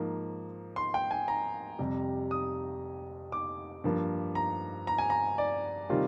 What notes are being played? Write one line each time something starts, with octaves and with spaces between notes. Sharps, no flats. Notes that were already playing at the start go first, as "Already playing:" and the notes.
Already playing: G#2 F3 A#3
C6
G5
G#5
A#5
F2 C3 G3
D#6
D6
G2 F3 A#3
A#5
A#5
G#5
A#5
D5
C3 D#3 G3 C4 F4